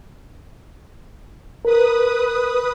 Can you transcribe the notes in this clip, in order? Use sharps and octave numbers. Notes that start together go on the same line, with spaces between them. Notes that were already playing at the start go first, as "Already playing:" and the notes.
A#4 B4 D#6